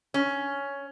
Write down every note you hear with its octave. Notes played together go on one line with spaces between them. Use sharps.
C#4